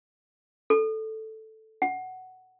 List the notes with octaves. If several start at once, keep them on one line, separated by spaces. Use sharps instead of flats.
A4
F#5